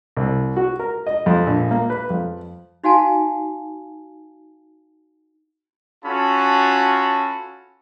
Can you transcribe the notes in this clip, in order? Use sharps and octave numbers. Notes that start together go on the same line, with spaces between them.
C2
F#4
A#4
D#5
F2
A#1
A#3
B4
F2
D#4 F#4 F5 F#5 G#5 A5
C#4 F4 F#4 A4 A5 B5